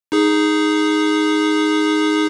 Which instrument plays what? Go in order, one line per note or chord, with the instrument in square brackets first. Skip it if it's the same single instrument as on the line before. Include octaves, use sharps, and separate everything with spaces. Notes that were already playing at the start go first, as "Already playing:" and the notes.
[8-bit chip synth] D#4 G#4